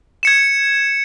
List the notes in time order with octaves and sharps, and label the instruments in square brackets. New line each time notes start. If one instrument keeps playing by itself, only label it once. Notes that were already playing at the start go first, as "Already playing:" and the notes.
[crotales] G#6 C#7 E7